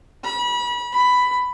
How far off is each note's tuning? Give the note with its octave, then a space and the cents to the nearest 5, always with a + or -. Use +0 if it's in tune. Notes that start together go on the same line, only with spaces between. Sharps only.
B5 -30
B5 +10